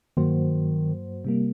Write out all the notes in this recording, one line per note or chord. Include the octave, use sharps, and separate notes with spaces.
G2 D#3 F#3 A#3 F#4 C5
C3 G3 A#3